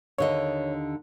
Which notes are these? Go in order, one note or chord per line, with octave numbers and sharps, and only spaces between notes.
D#2 D3 C#5 D#5